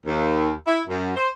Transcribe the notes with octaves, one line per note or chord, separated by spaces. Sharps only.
D#2
E4
F#2
C5